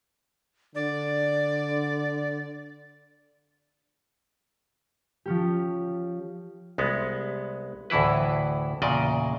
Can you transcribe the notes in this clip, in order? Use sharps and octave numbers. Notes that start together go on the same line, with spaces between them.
D3 D5
F3 C#4 G4
C2 G#3 B3
D2 A2 E3 E4 B4
E2 A#2 C#3 D5 D#5